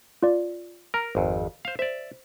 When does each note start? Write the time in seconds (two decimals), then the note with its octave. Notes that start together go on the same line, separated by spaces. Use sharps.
0.23 F4 D5
0.94 A#4 A#5 F6
1.15 G#1 F2
1.65 C5 F5
1.79 C5 D5 E5